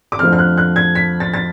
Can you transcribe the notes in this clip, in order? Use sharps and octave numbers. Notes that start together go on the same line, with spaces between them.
D6
F2 D3 F3 A3 F6
F6
F#6
F#6
G#6
B6
A6
A6